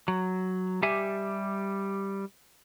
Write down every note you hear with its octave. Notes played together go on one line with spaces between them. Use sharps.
F#3
G3 G4 E5 G#5